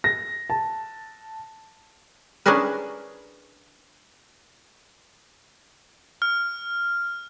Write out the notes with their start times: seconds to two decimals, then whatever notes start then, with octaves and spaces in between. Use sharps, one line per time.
0.04 A#6
0.50 A5
2.46 C#4 D4 E4 G#4 A#4 B4
6.22 F6